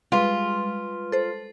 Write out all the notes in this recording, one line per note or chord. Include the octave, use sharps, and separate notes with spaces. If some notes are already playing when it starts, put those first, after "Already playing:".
G3 G#3 F4 B4
A4 C5